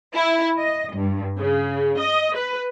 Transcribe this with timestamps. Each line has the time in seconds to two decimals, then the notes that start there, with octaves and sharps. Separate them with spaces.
0.14 E4
0.57 D#5
0.93 G2
1.37 C#3
1.98 D#5
2.36 B4